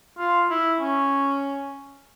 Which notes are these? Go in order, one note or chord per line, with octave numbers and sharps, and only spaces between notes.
F4
E4
C#4